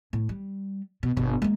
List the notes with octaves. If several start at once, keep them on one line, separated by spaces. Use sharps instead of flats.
A2
G3
B2
G1 B2
G#3 A#3